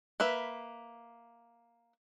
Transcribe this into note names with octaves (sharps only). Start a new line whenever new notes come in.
A#3 B4 E5